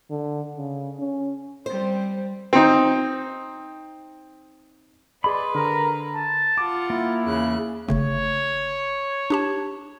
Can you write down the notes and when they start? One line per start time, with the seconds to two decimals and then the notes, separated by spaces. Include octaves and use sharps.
0.10 D3
0.56 C#3
0.99 C#4
1.66 G3 C4 C5
2.53 C4 D#4
5.24 G#4 B4 D5 D#5 B5 C6
5.55 D3 A#4 A#5
6.15 A5
6.58 F4 F#5 D6
6.90 A#3 E4
7.25 E2 C#3 F#6
7.88 G1 C#3 A3 C#5
9.30 D4 G4 A5